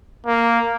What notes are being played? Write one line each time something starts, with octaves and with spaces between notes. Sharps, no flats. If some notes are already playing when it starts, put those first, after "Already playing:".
A#3